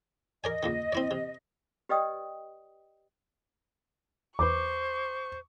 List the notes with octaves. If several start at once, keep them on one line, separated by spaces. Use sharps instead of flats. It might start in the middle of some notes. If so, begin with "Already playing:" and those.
A#4 D5 D#5 G#5
C#2 A#2 D#3
C4 E4 D5
C3
G4 B4 D5 D#5 G5 D#6
E2 B4 C5 C#6 D6